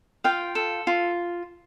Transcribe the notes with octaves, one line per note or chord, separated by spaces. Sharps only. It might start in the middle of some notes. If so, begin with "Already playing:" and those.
F4 F5 G5
A4
F4